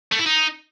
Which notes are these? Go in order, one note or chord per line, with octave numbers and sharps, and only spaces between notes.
A3
E4
D#4